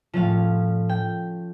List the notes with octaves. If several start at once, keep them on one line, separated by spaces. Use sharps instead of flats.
A2 F3 C#4 F5
G5